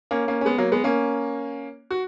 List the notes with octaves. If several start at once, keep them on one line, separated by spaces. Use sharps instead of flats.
A#3 C#4
A#3 C#4
C#4
G#3 B3
F#3 A#3
G#3 B3
A#3 C#4
F#4